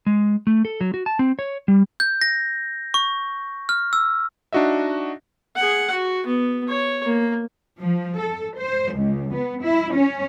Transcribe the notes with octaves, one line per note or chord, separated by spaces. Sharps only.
G#3
A3
A4
F#3
F#4
A5
C4
C#5
G3
G6
A#6
C#6
F6
E6
D4 D#4 F#4 D#5 E5
G#4 F#5
F#4
B3
C#5
A#3
F3
A4
C5
C#2
B3
E4
C#4